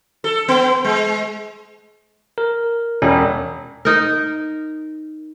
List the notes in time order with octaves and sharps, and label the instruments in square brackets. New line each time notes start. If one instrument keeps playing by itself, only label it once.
[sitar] A4
B3
G#3
[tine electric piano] A#4
[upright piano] E1 [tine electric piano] C#4
[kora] D#4 A#4